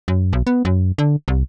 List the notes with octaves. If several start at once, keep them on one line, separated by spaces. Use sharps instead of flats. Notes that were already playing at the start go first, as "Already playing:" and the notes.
F#2
B1
B3
F#2
D3
C2